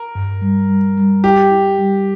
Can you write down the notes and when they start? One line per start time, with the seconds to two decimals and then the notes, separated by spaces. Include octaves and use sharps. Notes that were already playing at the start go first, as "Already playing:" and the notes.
Already playing: A#4
0.15 G2
0.42 G3
0.69 G3
0.97 G3
1.24 E4 G4
1.51 E4
1.79 G3